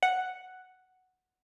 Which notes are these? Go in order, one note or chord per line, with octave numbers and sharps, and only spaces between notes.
F#5